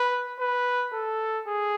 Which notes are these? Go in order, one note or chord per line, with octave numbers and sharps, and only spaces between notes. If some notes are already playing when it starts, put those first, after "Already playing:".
Already playing: B4
B4
A4
G#4